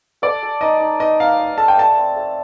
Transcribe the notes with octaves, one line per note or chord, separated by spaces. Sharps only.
A4 D5
A4
D#4 D#5
D#4
D#4 D#5
D#4 F5
D5
A4 A5
G5
A3 A5
C4
A3